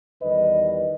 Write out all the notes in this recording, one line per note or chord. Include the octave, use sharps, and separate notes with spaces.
E2 D#3 G3 B4 D#5